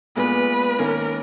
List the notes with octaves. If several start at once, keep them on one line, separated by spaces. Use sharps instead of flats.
A#2 G#3 B3 B4
D#3 A#3 C#4 A#4